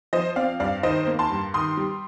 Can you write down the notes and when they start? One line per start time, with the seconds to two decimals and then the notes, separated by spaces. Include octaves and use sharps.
0.13 F3 C5 D#5
0.36 C4 D5 F5
0.60 G2 D5 F5
0.83 D#3 C5 D#5
1.07 A#3
1.19 A5 C6
1.31 G2
1.54 D#3 C6 D#6
1.77 G3